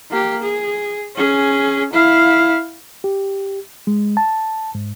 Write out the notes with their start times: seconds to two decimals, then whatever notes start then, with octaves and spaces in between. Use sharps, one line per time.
0.11 A#3 G4
0.42 G#4
1.16 C#4 G#4
1.93 E4 F5
3.04 G4
3.87 G#3
4.17 A5
4.75 G#2